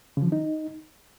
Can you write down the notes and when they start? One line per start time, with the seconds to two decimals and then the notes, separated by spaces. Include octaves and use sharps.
0.17 C#3
0.22 F3
0.27 D#3
0.32 D#4